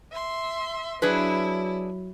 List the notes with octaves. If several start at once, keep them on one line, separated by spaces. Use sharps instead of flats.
E5 C6
F#3 D4 E4 G#4 B4